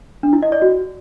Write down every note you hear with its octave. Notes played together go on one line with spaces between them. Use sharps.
D4
E4
D#5
D5
F#4